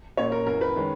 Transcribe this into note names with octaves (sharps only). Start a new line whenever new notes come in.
A#2 A#3 C#4 C#5
A#4
F#2 E3 B3 A#4
B4
D#3 G#3 C#4